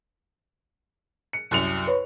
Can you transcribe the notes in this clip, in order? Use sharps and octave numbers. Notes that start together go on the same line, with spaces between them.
C#7
C2 F#2 F7
B4 C#5